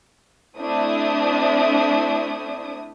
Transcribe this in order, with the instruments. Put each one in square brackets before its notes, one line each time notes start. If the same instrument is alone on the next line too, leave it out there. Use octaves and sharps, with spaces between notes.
[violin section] A3 C4 D4 E4 E5 D#6